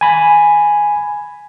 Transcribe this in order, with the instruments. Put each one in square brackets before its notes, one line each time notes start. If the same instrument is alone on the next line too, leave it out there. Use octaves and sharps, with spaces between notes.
[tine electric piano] G#5 B5